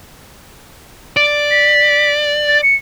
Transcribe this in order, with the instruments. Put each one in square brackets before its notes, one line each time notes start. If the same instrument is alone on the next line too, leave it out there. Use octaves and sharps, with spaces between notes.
[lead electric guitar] D5
[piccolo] B6
A6
C#7